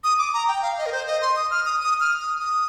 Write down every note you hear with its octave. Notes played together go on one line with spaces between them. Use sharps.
D#6
D6
A#5
G5
F5
D#5
A#4
C5
D#5
C6
D#6
F6
D#6
D#6
F6
D#6
D#6